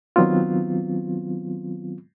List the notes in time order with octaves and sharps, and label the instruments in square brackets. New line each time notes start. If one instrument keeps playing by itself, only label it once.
[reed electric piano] D#3 F#3 B3 C4 F4